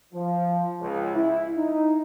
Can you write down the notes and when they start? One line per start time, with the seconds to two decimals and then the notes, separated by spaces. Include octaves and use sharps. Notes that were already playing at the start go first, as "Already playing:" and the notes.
0.14 F3
0.81 C#2
1.15 E4
1.57 D#4